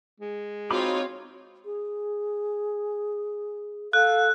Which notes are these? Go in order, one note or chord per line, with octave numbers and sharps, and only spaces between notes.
G#3
C4 D#4 F4 F#4 C#5 B5 D6
G#4
A4 F5 F#6